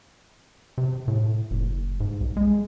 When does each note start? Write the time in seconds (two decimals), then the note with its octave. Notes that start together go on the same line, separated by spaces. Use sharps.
0.78 C3
1.08 A2
1.51 F#1
2.00 G#2
2.21 C2
2.37 G#3